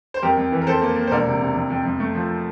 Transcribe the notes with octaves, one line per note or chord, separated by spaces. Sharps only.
C5
F2 G4 A#4
F2
E3
A#4
F2 A4 C5
A#3
A#3
C5
E1 A#4 D5
C3
C3
F2
F2
F2
A3
F3